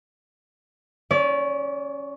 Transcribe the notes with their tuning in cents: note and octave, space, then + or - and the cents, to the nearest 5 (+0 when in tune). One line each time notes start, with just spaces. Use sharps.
C#4 +0 D5 -30